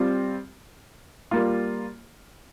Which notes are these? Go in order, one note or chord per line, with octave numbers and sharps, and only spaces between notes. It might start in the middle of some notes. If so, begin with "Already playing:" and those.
Already playing: G3 C4 F4
G3 A#3 F4